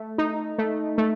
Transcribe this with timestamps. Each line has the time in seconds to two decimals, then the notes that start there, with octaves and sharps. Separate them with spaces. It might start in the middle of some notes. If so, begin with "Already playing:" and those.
Already playing: A3
0.18 D#4
0.58 A3
0.98 A3